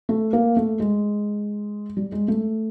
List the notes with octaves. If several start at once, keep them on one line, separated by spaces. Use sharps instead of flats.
A3
A#3
A3
G#3
G3
G#3
A3